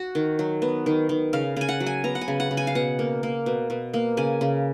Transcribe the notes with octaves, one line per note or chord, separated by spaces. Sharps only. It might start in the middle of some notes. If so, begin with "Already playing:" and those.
Already playing: F#4
D#3
F#3
B3
D#3
D#3
C#3 F5
C#3 G#5
F#5
F#3
G#5
B3 A#5
F#5
G#5
C#3
F#5
C#3
G#5
F5
B2 F#5
A#3
A#3
B2
B2
A#3
C#3 G#5
C#3